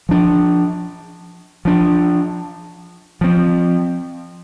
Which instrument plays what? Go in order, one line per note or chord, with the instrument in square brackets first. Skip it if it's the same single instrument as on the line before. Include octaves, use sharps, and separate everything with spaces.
[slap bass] F3 D4
F3 D4
F3 C4